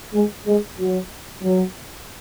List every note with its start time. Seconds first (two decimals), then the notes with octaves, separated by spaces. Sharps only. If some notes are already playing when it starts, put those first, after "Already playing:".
0.14 G#3
0.47 G#3
0.79 F#3
1.43 F#3